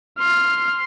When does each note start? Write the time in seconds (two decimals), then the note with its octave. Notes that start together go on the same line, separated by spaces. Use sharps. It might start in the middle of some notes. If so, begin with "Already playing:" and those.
0.19 C6 F6